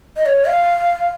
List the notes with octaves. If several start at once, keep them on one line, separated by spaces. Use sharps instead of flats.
D#5
C#5
F5